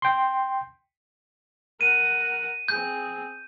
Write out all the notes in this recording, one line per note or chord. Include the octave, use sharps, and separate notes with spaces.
G5 C6
A#4 F#5 D#7
C4 G#4 G6